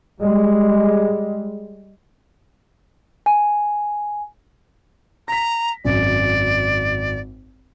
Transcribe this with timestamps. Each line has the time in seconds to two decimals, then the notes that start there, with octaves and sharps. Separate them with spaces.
0.21 G3 G#3
3.26 G#5
5.28 A#5 A#6 B6
5.85 G#1 F#2 D5